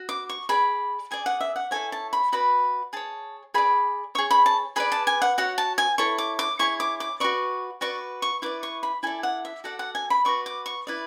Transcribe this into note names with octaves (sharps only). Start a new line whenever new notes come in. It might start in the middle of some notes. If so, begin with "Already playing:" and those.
Already playing: F#4
D6
C#6
G#4 D5 B5
G#4 D5 G#5
F#5
E5
F#5
E4 A4 C#5 G#5
A5
B5
F#4 B4 D5 B5
G#4 C#5 A5
G#4 D5 B5
G#4 C#5 C#6
B5
A5
G#4 B4 D5 B5
A5
G#5
F#5
F#4 C#5 F#5
A5
G#5
E4 A4 C#5 C#6
D6
D6
E4 G#4 C#5 C#6
D6
D6
F#4 B4 D5 C#6
F#4 B4 D5 C#6
C#6
E4 B4 D5 D6
C#6
B5
E4 A4 D5 G#5
F#5
E5
F#4 A4 D5 F#5
F#5
G#5
B5
F#4 B4 D5 C#6
D6
C#6
E4 B4 D5